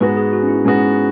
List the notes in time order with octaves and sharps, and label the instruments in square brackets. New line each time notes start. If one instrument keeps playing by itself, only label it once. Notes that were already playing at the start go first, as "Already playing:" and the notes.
[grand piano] G#2 G#3 B3 F#4 [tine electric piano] B4
[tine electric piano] G#4
F#4
C#4
E4
[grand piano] G#2 G#3 B3 F#4 [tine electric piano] C#4